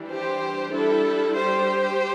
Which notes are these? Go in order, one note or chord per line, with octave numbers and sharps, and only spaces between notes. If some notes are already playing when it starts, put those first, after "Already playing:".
Already playing: E3 G3 D4
G4 C5
G3 D4 E4 A4
G4 C5